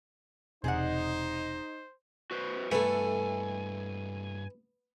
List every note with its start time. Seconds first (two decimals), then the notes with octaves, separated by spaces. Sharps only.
0.64 E1 C3 D#4 G#4 C5 D5 F#5
2.31 F#4 B4 C5
2.71 G2 A3 B3 E4 A4 G#5